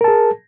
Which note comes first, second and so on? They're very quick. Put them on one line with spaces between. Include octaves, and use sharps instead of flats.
A#4 A5 G#4